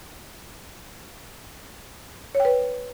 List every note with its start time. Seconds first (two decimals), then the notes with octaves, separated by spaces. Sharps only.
2.35 C#5
2.40 G5
2.45 B4